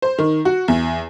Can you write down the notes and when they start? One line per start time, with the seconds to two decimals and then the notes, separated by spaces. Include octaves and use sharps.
0.02 C5
0.18 D#3
0.45 F#4
0.68 E2